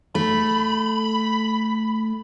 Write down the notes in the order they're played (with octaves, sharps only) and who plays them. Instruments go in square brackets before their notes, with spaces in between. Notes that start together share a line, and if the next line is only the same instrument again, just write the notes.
[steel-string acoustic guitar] A3 [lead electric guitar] B5